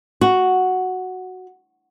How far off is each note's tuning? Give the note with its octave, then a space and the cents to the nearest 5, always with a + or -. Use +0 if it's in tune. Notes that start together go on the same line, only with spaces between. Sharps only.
F#4 +0